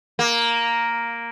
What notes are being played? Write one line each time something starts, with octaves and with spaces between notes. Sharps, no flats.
A#3